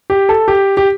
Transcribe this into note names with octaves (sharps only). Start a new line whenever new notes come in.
G4
A4
G4
G4